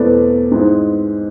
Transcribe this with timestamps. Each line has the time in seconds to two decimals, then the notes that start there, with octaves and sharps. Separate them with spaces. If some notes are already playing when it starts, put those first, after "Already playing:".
Already playing: E2 B2 A3 C4 E4 B4 D5
0.51 G#2 G#3 C4 E4